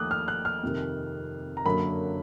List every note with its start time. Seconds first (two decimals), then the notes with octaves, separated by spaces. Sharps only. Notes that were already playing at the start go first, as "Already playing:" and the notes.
Already playing: D#2 F3 A3 D6 D#6 F#6
0.11 F6
0.28 F#6
0.45 F6
0.63 F2 C3 D#3
1.57 A#5
1.65 F#2 D3 F#3 A#3 B5